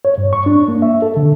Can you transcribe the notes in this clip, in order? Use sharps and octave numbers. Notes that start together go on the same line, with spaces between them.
C#5
G2
C#6
D4
A#3
E5
A4
D3